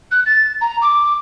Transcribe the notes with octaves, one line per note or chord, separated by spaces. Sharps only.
F#6
A6
A#5
D6